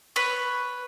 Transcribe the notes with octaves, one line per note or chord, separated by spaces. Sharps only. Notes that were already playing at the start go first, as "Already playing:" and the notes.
B4 C#5